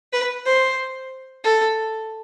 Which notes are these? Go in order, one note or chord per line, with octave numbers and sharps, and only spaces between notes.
B4
C5
A4